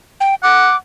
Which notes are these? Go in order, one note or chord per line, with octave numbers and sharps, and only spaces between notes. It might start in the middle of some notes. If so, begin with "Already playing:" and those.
G5
F#5 D6